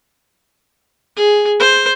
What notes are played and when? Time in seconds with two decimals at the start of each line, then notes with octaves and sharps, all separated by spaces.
1.17 G#4
1.60 C5